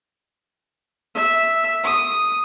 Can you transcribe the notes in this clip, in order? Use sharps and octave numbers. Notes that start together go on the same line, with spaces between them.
E5
D#6